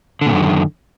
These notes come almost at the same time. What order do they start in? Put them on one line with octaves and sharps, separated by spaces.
D3 A#2 F#2 D#3